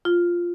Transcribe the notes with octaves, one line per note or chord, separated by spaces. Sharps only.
F4